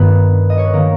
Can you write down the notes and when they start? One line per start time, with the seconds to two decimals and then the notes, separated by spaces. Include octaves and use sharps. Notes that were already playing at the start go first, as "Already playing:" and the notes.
Already playing: G2 D#3 B3 B4
0.50 D#5
0.58 C#5
0.65 B4
0.73 D#3 A#3 A#4